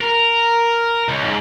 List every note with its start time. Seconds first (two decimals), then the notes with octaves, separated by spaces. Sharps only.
0.01 A#4
1.08 C#2
1.24 G#2